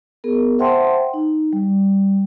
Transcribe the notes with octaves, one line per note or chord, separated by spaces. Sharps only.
B3 G#4 A#4
C5 E5 F#5 G5 A5 C6
D#4
G3